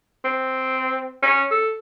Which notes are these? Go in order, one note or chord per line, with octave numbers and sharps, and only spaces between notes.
C4
C#4
A4